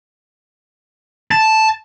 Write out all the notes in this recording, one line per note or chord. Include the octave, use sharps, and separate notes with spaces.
A5